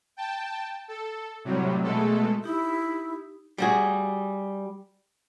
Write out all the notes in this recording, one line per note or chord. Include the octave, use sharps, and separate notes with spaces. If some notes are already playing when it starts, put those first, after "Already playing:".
G5 A5
A4
A2 C3 F#3 G3
B2 G#3 A3 A4
D#4 E4 G4
G3 F#4 G#4